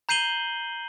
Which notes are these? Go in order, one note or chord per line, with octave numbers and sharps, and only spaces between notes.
A#5 G6 C7 D#7 F#7 G7